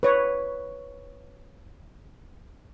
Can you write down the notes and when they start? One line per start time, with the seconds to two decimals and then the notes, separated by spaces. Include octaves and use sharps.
0.03 B4 C#5